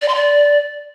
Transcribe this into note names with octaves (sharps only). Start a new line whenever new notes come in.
D5
C6
D5